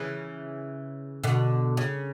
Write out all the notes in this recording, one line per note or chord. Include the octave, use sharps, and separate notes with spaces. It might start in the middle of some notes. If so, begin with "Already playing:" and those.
Already playing: C#3 E3
B2 D3
C#3